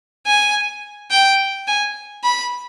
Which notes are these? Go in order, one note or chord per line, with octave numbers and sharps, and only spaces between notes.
G#5
G5
G#5
B5